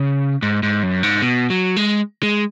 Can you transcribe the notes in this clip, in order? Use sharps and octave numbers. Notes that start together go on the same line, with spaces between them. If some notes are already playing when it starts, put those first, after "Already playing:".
Already playing: C#3
G#2
G#2
F#2
G#2
B2
F#3
G#3
G#3